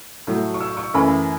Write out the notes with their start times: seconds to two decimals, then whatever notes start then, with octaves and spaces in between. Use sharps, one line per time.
0.27 A2 F#3 A3
0.54 C#6
0.61 E6
0.77 C#6
0.94 F#2 E3 A3 B5